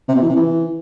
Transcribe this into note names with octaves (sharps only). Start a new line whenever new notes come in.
C3
B2
E3
C3
E3